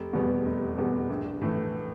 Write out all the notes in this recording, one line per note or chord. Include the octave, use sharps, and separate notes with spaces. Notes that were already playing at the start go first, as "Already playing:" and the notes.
Already playing: F1
E2 B2 G3 B3
F1
E2 B2 G3 B3
A#1
A2 E3 A3